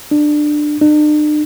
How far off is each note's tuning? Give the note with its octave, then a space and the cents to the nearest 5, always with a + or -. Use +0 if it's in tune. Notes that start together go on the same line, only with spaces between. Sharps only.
D4 +20
D4 +45